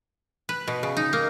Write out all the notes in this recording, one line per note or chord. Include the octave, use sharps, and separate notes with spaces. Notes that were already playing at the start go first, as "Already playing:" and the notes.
B4
B2
C#3
D#4
A#3